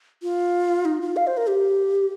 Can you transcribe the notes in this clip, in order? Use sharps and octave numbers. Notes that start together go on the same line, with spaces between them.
F4
D#4
F4
F5
C5
A#4
G4